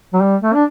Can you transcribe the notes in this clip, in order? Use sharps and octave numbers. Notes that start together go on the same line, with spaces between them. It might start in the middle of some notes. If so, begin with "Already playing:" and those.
F#3
G3
A3
D4